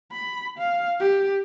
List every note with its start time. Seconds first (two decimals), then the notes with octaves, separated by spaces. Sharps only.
0.12 B5
0.58 F5
1.00 G4